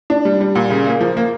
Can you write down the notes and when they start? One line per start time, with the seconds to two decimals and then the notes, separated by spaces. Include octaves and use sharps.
0.10 D4
0.25 G3
0.40 G3
0.55 A#2
0.70 C#3
0.86 A#3
1.01 F3
1.17 A#3